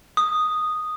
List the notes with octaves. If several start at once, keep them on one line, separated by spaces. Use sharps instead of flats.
D#6